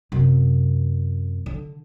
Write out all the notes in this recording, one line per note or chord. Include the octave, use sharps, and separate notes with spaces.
F#2 C3
D3